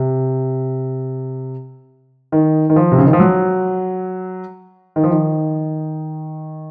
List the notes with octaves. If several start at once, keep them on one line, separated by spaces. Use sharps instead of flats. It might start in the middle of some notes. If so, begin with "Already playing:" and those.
Already playing: C3
D#3
D#3
F3
C3
C#3
D#3
F3
F#3
D#3
F3
D#3